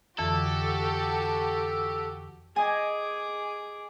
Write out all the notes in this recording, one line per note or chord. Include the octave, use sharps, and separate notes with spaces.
F2 D3 E3 F#4 G4 A4
G#4 D#5 G#5 D6